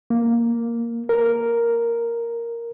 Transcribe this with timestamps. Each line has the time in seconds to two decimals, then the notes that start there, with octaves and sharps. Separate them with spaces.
0.10 A#3
1.09 A#4